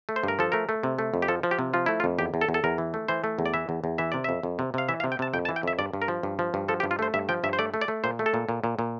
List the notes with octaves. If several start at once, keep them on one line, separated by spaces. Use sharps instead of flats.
A3
C5
G2 A#4
F3 A4
A3 A#4
A3
C3
A3
F2
G4
F3 A4
F3
G4
C3
F3 F4
A3 E4
F4
F2
E2 G4
E2
A4
E2
A4
E2 A#4
E3
A3
E3 C5
A3
E2
D5
E3 E5
E2
E2
E3 E5
C3 D5
F2 E5
F2
C3
C3 F5
E3 E5
F5
C3
G5
C3 A5
F2 G5
A5
E3
G5
F2 E5
G2 D5
G2
A#4
F3
G2
F3
G2
F3 A4
G4
G2
F4
A3 C5
G2 E5
F3 G5
G2 E5
C5
A3 D5
A3
D5
A3
A#2 C5
A3
A4
A#2
A#2
A#2
A#2